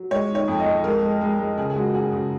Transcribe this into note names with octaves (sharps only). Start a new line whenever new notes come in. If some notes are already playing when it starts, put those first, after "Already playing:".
Already playing: F#3
G#3 C#5
D#3
C#5
F2
D#5
F2
G#3 A#4
G#3
G#3
G#3
C#3 G#4
G#4
G#3 F#4
F#4
F#2 G#4
C#3 F#4